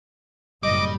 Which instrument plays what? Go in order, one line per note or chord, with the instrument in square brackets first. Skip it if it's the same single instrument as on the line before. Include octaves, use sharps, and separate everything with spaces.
[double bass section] F#1 A2 [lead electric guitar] G3 [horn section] D#5 [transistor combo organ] D6